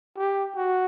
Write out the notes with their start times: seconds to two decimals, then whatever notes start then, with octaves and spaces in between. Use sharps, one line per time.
0.18 G4
0.57 F#4